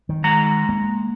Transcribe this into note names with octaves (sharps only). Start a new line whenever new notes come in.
D#3
G#3 F#5 A#5
A#3